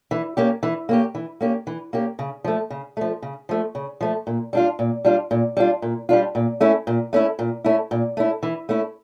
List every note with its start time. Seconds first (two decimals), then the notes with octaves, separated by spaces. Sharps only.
0.11 E3
0.37 A#3 C#4 G4
0.63 E3
0.89 A#3 C#4 G4
1.15 E3
1.41 A#3 C#4 G4
1.67 E3
1.93 A#3 C#4 G4
2.19 C#3
2.44 F3 A3
2.70 C#3
2.97 F3 A3
3.22 C#3
3.49 F3 A3
3.75 C#3
4.01 F3 A3
4.27 A#2
4.53 G3 D4 F4
4.79 A#2
5.05 G3 D4 F4
5.31 A#2
5.57 G3 D4 F4
5.82 A#2
6.09 G3 D4 F4
6.35 A#2
6.61 A3 C#4 E4
6.87 A#2
7.13 A3 C#4 E4
7.39 A#2
7.64 A3 C#4 E4
7.91 A#2
8.17 A3 C#4 E4
8.43 E3
8.69 A3 C#4 E4